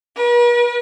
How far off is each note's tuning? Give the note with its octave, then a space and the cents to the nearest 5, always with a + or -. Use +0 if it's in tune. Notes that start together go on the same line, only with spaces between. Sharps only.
B4 -45